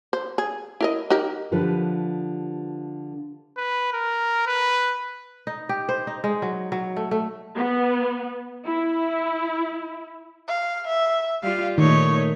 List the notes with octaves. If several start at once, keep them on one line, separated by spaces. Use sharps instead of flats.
C5
G#4
E4 A#4 D#5
D#4 G4 A#4
D3 F3 G4 B4 C5
B4
A#4
B4
D#4
G4
C5
D#4
G#3
F#3
F#3
A3
A3
B3
E4
F5
E5
G3 F4 F5
A#2 D#3 A3 D#4 C#5